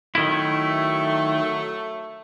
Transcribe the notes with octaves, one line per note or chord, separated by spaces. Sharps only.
D#3 F#3 A3 E4